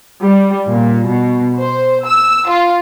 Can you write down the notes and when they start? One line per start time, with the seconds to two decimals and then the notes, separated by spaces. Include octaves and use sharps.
0.25 G3
0.71 A#2
1.11 B2
1.58 C5
2.04 E6
2.46 F4